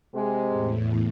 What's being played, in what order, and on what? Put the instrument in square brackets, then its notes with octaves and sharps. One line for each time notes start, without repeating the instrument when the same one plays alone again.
[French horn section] C3 G#3
[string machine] E2 A2